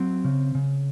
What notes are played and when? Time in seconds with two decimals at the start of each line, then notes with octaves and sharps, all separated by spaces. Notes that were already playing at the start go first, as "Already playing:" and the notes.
Already playing: F#3 C4
0.24 C#3
0.55 C#3